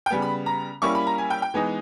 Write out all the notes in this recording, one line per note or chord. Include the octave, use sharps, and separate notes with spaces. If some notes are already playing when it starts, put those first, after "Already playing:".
G5
C#3 G3 B3 G#5
B5
A#5
G3 A#3 C#4 E4 C#6
B5
A#5
G#5
G5
G5
E3 G#3 B3 D#4 G#5